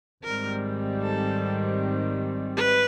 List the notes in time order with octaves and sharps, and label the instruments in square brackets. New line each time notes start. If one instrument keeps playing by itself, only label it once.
[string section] G#1 G#2 D#3 G3 C4 [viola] A#4
[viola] A4
B4